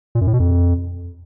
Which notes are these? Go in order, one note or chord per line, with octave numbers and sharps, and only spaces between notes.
A#2
F#2
A2
B2
F2